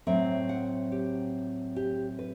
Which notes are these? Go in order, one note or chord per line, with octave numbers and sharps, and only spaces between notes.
A2 F#3 C4 E5
F#5
G4
G4
B4